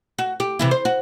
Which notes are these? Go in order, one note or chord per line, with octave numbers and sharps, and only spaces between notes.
F#4
G4
C3 E3 E4
C5
F#4